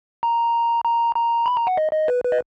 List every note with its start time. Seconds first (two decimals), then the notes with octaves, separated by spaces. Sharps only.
0.23 A#5
0.84 A#5
1.15 A#5
1.46 B5
1.57 A#5
1.67 F#5
1.77 D#5
1.93 D#5
2.08 B4
2.24 B4
2.32 D#5